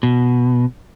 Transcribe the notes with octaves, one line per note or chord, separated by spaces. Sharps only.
B2